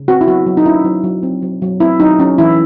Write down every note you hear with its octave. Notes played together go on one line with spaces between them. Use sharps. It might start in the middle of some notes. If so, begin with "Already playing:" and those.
Already playing: C#3
C4 F#4
E4
F#3 F#4
F#3
D#4
C#4 E4
F#3
F#3
C4
F#3
F#3
C4 E4
F#3 D#4
F#3 C#4
E3 E4